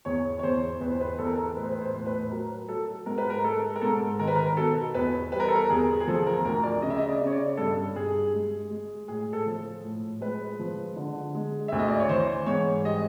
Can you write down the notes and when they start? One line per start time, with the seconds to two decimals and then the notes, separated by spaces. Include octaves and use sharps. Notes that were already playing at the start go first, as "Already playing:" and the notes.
0.05 E2 C#5
0.39 C#5
0.43 E2 C5
0.80 E2 B4
0.91 C5
1.01 B4
1.18 E2 A4
1.27 A#4
1.36 A4
1.56 A2 B4
1.63 C5
1.72 B4
1.81 C5
1.93 A2
2.06 B4
2.31 F#3 A#4
2.68 F#3 A4
3.06 G#2 A#4
3.18 B4
3.30 A#4
3.44 G#3 A4
3.76 A#4
3.81 G#2 A4
4.19 D#3 A#4
4.28 B4
4.36 A#4
4.57 B2 A4
4.95 E2 B4
5.32 G3 B4
5.40 A#4
5.48 A4
5.55 A#4
5.70 E2 G#4
6.00 G#4
6.07 F3 A4
6.27 A#4
6.45 D2 A#4
6.63 D5
6.82 C#3 D#5
6.90 E5
6.97 D#5
7.08 D5
7.21 C#3
7.27 C#5
7.32 D5
7.57 G2 A4
7.95 G2 G#4
8.33 G#3
8.70 G#3
9.08 A2 G#4
9.33 A4
9.46 F3
9.84 A2
10.21 G#3 B4
10.59 F3
10.96 D3
11.35 G#3
11.68 D2 E5
11.79 D#5
11.88 D5
12.00 C#5
12.09 E3 C5
12.46 G#2 C#5
12.84 G3 D#5